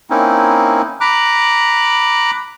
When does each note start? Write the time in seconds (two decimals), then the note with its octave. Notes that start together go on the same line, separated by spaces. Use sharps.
0.10 A#3 C4 C#4 D#4 E4
1.01 A#5 B5 D6 F#6